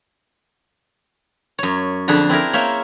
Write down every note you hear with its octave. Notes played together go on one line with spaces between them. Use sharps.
F#2 C#5
F2 D3 D4 G#4 B5
C4 E4 G#4 A#4
A#3 C5 C#5 E5